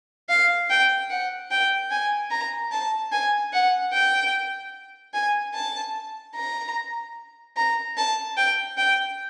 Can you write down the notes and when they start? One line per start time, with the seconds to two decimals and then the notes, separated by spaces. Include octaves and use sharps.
0.29 F5
0.70 G5
1.10 F#5
1.51 G5
1.91 G#5
2.31 A#5
2.72 A5
3.12 G#5
3.53 F#5
3.93 G5
5.13 G#5
5.54 A5
6.35 A#5
7.56 A#5
7.97 A5
8.37 G5
8.77 G5